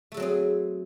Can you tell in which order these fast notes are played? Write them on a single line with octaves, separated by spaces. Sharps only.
A3 A4 F#3 C4 G#4